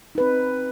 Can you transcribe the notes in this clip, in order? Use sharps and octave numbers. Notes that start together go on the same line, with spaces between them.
C4 D#4 B4